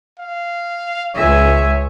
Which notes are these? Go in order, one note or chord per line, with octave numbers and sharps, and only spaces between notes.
F5
C#2 G#3 C#5 E5 G#5